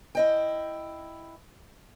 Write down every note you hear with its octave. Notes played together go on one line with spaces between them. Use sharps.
E4 D#5 G5